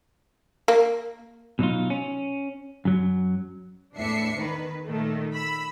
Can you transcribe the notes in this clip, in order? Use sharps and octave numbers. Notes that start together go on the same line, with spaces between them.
A#3
B2 F#3 D#4 F4
C#4
F#2 F#3
E2 A2 D4 E5 C7 C#7
D#3 B4
A#2 D#3 A3
B5 E6